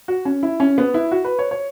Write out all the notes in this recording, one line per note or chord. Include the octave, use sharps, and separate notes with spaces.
F#4
C#4
E4
C#4
B3
E4
F#4
B4
C#5
C#5